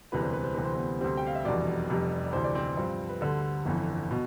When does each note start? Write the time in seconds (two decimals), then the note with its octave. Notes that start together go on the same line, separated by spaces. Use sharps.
0.12 E1 D2 C3 E3 G3 B4
0.23 C5
0.33 B4
0.44 C5
0.55 D2 C3 E3 G3 C4 B4
0.65 C5
0.75 B3 B4
1.01 D2 C3 G3 C4 C5
1.17 G5
1.26 F5
1.35 E5
1.45 F1 E2 B2 G3 D4 D5
1.89 F1 F2 C3 G3
2.33 D2 C3 E3 C5
2.44 D5
2.55 C4 C5
2.77 G2 F3 C4
3.09 B4
3.21 D2 D3 G3 A4
3.65 G1 F2 E3
4.11 B2